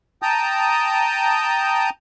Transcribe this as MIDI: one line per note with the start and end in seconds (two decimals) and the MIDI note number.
0.22 1.90 79
0.22 1.90 81
0.22 1.90 82
0.22 1.90 87
0.22 1.90 91